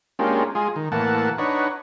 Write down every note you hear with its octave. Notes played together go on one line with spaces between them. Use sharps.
G#3 A#3 C#4 D4 F4 G4
G#3 F4 G#4
D#3
A2 E3 A#3 F#5 A5
D4 D#4 B4 C#5 F#5